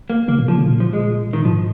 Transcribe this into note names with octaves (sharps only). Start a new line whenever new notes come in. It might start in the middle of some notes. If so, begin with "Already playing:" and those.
A#3
C#3 A#3
A#2
C#3 F3
C#3
A#2
F3
G#3
D#3
G#2 F3